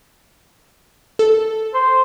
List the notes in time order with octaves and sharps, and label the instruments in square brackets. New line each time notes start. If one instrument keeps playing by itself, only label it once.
[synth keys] A4
[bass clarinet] C5